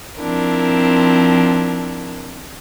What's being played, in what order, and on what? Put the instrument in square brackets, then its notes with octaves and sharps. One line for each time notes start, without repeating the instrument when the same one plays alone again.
[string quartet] F3 C4 D4 E4 A#4